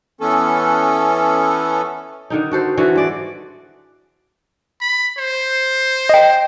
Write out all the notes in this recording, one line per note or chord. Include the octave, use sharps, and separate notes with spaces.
E3 B3 C#4 A4
D3 D#3 D#4
F#4 A4 C5
D3 E3 F#4 A4
G#3 D5
B5
C5
D#5 G5